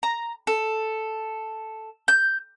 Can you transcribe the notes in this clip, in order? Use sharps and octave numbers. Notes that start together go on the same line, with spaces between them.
A#5
A4
G6